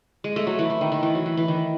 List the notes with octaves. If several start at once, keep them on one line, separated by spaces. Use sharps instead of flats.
G#3
A3
F#3
E3
E3
D#3
D#3
E3
F#3
E3
E3
D#3